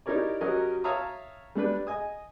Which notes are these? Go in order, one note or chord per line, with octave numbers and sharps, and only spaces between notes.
D#4 E4 G4 A#4 C#5 D5
F#3 C#4 G4 A#4 D#5
C#5 E5 F5 A5 A#5 D#6
G3 A3 D4 B4
D#5 G#5 D#6